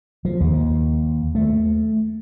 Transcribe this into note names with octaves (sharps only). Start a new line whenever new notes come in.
F3
D#2
A3